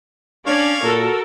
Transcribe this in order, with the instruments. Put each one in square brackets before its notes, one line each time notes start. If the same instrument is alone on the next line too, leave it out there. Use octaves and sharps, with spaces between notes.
[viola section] C#4 D5 [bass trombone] D4 [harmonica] C#5 F5
[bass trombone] A#2 [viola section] F#4 A4 A#4